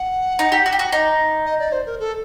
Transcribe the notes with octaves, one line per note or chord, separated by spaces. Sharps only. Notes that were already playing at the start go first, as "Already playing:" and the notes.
Already playing: F#5
D#4
G4
F#4
G4
F#4
D#4
D#5
D5
C5
A#4
A4